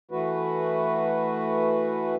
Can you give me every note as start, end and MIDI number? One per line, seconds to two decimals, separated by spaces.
0.11 2.15 52
0.11 2.15 57
0.11 2.15 66
0.11 2.15 71